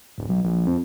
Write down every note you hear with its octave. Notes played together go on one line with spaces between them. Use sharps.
D1
B1
A#1
F2